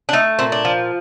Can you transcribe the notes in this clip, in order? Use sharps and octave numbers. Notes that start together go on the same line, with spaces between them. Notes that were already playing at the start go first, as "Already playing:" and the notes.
D4
A3 D#4
A#2 C4
D4
F3